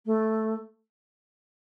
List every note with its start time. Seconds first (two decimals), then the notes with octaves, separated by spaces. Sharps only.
0.05 A3